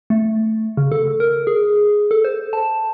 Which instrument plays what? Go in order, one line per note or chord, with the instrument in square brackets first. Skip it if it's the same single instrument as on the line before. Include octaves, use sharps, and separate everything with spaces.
[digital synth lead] A3
C#3
A4
A#4
G#4
A4
C5
A5